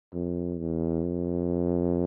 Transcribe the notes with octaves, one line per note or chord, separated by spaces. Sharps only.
F2
E2
F2